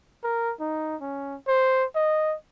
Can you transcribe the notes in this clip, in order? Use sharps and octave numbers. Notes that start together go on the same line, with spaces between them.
A#4
D#4
C#4
C5
D#5